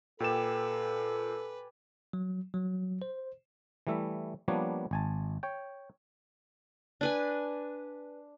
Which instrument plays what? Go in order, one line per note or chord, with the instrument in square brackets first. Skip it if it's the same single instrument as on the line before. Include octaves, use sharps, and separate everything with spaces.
[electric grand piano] A#2 E7 [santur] G4 G#5 A5 [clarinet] A4 [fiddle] B4
[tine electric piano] F#3
F#3
C5
[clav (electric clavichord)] E3 G3 A3 E5
F3 G3 A#3 B3 D4 C#5
G#1 G#5 A5
C#5 G5
[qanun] D4 B4 G#5